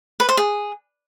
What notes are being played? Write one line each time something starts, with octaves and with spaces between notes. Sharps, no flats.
B4
C5
G#4